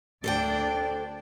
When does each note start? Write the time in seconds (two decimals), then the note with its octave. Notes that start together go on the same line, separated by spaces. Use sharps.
0.24 D2 D4 A4 C5 D5 G5